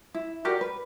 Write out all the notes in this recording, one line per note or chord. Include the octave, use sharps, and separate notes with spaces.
E4
F#4 G4 A#4 D5
B4